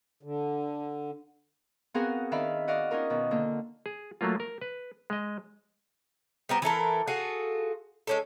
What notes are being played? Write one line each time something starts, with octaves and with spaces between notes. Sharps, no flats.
D3
B3 C4 F#4 G#4 A#4 F5
D#3 D4 D5 E5 F5 B5
F#4 D5 D#5 F5
C#4 D#4 F4 A#4
B2 D#3
D3 A#3
G#4
F#3 A3 A#3 F4
A#4
B4
G#3 D#5
G3 B3 A#4 C5
E3 E4 A4 A#4
F4 F#4 G#4 A4
G#3 C#4 A4